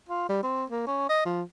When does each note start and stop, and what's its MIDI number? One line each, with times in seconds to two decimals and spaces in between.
0.09 0.27 65
0.29 0.41 55
0.43 0.65 60
0.70 0.84 58
0.87 1.04 61
1.09 1.23 75
1.26 1.42 53